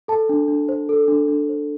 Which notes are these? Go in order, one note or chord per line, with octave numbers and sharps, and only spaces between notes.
A4 A5
D4
D4
C5
A4
D4
D4
C5